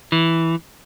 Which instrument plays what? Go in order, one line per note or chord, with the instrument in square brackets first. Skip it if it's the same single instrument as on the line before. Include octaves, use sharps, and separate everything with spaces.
[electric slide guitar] E3